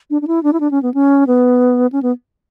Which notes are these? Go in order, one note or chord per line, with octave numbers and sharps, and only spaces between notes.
D4
D4
E4
D4
E4
D4
C#4
B3
C#4
B3
C#4
B3